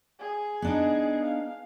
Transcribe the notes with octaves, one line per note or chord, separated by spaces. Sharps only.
G#4
B3 D4 D#4
F5